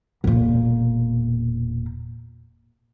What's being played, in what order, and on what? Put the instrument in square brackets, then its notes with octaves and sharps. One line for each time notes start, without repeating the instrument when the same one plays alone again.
[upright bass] E1 A#2